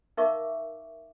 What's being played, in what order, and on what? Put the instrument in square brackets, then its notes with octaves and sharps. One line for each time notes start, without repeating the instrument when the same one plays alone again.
[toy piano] D#4 A#4 E5 F5 C#6 D6